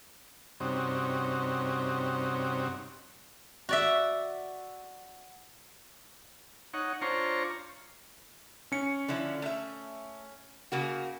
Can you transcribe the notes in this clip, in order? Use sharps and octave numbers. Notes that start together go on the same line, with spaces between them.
G2 C3 C4 C#4 D#4 F#4
F#4 D5 E5
D#4 C#5 F#5
D4 F4 C5 C#5 A#5 C#6
C#4 C#7
D3 F3 E4
A3 E5
C#3 A#3 F#4